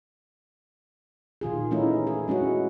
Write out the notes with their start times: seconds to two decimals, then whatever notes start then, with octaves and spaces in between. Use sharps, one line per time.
1.41 A#2 D#3 F4 G#4
1.71 E3 A3 C#4 D#4 E4
2.07 G#4
2.28 G#3 C#4 E4 F#4